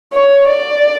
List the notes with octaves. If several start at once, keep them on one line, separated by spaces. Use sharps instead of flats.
C#5
D5